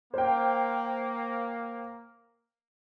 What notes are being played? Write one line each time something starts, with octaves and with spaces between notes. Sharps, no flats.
A#3 C5 G5